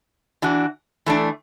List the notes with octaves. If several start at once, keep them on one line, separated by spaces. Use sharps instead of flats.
E3 D4 F#4
E3 A3 D4